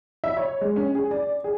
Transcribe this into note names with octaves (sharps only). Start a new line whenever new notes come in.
E5
C#5
G#3
C#4
G#4
D5
G#4